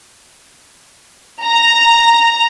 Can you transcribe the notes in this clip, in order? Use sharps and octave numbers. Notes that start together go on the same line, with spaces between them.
A#5